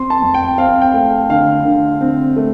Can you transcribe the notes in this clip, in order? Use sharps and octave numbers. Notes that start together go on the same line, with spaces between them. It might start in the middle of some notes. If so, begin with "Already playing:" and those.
Already playing: C4 C6
A5
F2
G5
C4 F5
G5
A3
D3 F5
D3
C4
A3